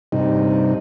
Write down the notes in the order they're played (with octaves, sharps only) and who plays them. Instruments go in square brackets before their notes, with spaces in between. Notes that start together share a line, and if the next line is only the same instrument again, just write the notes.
[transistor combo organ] G2 C3 D#4